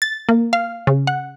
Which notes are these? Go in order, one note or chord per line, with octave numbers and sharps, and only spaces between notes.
A6
A#3
F5
C#3
F#5